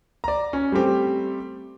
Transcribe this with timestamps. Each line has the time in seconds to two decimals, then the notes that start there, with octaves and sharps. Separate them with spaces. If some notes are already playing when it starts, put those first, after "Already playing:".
0.24 D5 A#5
0.53 C#4
0.72 G3 A3 C4 G4